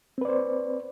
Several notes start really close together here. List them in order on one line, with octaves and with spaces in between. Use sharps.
C4 B4 D5 C5